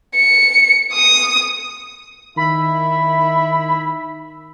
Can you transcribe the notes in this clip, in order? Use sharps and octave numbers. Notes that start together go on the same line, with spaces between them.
C#7
D#6
D#3 E4 E5 B5